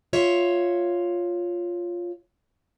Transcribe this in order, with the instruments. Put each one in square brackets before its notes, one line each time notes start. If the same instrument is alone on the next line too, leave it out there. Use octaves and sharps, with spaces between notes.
[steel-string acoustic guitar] F4 C#5 E5